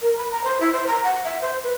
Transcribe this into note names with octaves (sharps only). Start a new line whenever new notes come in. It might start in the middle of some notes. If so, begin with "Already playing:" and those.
A#4
B5
A#5
C5
E4
C5
A#5
F#5
E5
C5
B4